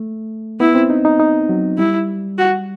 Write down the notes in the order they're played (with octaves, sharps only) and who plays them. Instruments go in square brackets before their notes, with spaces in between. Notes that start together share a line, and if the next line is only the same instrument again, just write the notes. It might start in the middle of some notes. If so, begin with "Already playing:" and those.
Already playing: [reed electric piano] A3
[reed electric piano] B3 [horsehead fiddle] E4
[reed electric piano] C4
D#4
D#4
D#4
F#3
[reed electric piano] G3 [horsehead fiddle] E4
[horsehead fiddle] F#4